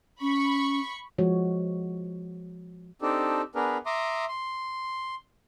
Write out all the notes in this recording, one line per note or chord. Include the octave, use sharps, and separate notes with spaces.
C#4 B5 C#6
F3 G#3 F#4 C#5
C4 D4 D#4 G4 A4
B3 D4 G#4 A#4 B4
E5 A#5 C6 D6 D#6
C6